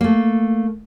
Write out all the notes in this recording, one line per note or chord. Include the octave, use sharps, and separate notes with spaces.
A3 A#3